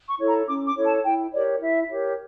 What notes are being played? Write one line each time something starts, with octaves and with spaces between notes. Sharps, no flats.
C#6
E4 A4 C#5
A#5
C#4 D6
D6
E4 A4 C#5
A5
E4 G5
G4 A#4 C#5 D5
E4 E5
G4 A#4 C#5